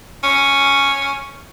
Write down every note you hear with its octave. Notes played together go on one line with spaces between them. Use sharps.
C#4